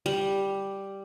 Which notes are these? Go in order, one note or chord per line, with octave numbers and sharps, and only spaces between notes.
G3